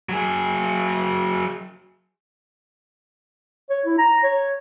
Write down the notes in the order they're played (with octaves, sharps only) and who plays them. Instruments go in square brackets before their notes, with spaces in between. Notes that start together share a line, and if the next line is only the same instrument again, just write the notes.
[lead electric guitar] F#3 G#4
[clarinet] C#5
E4
A#5
C#5